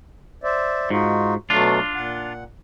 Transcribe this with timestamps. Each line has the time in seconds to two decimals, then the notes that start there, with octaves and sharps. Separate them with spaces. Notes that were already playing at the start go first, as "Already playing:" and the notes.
0.44 C5 D5 E5
0.90 G#2 D#4 F4 F#4
1.50 B2 F#3 A3 D4 F4
1.95 A#2 F#5